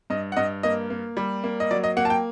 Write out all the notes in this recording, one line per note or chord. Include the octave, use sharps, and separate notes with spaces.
G2 D#5
F#5
G2 D#5
A#3 D#5
A#3
G3
A#3
D#5
F#3 D5
D#5
A#3 F#5
A5
G5